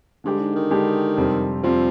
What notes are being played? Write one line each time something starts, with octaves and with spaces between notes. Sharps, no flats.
G2 D3 G#3 D4 G4
G#2
D#3
D3 G#3 D4 G4
F2 C3 G3 C4
F2 C3 F3 G3 C4